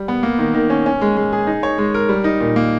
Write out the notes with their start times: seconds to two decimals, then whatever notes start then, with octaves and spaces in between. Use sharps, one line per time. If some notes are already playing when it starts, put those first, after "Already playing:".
Already playing: G3
0.08 B3
0.23 A#3
0.39 D#3
0.54 D#3
0.70 C#4
0.86 C#4
1.01 G#3
1.17 G#3
1.33 G#4
1.47 D#4
1.63 C#5
1.78 G#3
1.94 A#4
2.09 G3
2.24 D#4
2.40 A#2
2.56 A#3